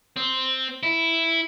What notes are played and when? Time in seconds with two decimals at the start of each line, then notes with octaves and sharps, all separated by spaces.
0.16 C4
0.83 E4